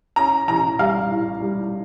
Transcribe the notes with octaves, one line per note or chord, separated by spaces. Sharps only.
C#4 A#5
A1 A#5
G3 F5
A2
G3